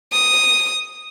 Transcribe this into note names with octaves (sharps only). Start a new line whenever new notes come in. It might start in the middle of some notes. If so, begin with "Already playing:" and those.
D#6